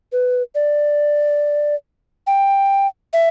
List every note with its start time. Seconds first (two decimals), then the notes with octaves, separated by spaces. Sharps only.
0.12 B4
0.55 D5
2.27 G5
3.13 E5